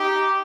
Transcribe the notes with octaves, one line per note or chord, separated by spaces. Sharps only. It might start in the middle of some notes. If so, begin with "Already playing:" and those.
Already playing: D#4 G4